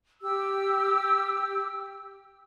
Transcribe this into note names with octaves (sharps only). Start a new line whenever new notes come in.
G4 E6